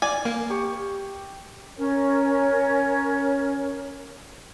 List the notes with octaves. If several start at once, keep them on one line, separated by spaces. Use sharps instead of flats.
D5 G#5
A#3
G4 C#6
C#4 A#4 C#5